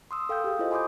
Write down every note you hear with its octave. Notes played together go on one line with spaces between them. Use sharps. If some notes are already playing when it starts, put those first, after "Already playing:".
C6 D#6 E6
A4 F5 G5 D#6 G6
G4 G#4
E4 F4 G4 A4 C5 D#5
G#5 B5 C6 D6 D#6 G6